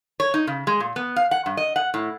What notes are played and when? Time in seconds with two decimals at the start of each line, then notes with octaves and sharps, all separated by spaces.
0.20 C#5
0.34 D#4
0.47 C#3
0.67 G#3
0.80 A#2
0.96 B3
1.16 F5
1.31 F#5
1.46 G2
1.57 D#5
1.76 F#5
1.94 A2